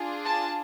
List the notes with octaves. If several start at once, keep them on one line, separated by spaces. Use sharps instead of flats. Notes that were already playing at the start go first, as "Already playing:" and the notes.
Already playing: D4 F4 G#4
A5